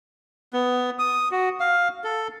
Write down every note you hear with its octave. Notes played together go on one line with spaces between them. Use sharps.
B3
D#6
F#4
F5
A4